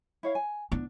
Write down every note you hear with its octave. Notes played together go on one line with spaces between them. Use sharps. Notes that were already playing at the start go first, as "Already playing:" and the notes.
E4 C#5 F5
G#5
B3 D4 E4